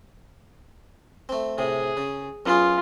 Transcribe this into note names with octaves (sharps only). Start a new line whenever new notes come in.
A3 C4
A2 C3 G#4
C#3
F#2 B3 F4 G#4